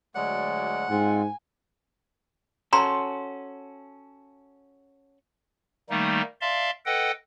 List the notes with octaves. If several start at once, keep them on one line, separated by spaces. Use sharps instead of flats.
D2 F#3 G#3 D5 F#5
G#2 G#3 C4 F4 G#5
C#4 F#4 A4 A#5 C6
D#3 G3 A3 A#3 D#4
D5 E5 F5 A5 C6
A4 B4 D#5 F#5 G5